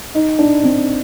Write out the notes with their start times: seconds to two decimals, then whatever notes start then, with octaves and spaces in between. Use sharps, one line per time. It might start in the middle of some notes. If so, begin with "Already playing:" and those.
0.15 D#4
0.39 D4
0.64 C4